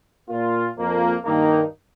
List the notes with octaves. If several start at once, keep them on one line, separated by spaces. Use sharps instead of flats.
A#2 A#3 F4
F2 F3 A#3 F4
G2 D#3 A#3 D#4